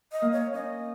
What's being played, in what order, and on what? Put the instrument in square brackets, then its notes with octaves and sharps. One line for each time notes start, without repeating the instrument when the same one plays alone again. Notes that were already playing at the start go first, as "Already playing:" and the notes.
[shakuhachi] D#5
[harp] A#3
[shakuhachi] C#5
[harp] C#4 [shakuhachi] D#5